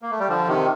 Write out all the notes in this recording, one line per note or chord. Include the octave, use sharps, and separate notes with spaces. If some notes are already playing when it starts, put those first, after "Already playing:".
A#3
A3
G3
D3 F3
C3 D#3